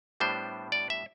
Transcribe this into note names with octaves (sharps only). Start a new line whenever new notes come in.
A2 G3 B3 D4 C5
D5
E5